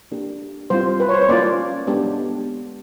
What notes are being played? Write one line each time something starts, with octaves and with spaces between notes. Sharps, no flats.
A#3 D4 G4
G3 C4 F4 C5
B4
C#5
C5
C#5
A#3 C#4 F4 D5
G#3 B3 D4 G4